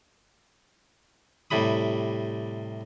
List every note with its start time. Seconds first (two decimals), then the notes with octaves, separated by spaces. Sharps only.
1.51 A2 C3 G3 B5 D#6